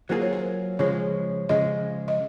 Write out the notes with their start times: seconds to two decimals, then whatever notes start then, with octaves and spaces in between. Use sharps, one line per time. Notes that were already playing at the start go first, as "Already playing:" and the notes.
0.09 F#3 A#3 F4 G#4 C5
0.21 C#5
0.33 C5
0.79 C#3 F3 G#3 C#5
1.49 C#3 F3 G#3 D#5
2.08 D#5